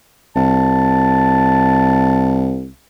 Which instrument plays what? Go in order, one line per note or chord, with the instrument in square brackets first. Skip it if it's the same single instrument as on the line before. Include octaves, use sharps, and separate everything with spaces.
[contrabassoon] C2 [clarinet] A5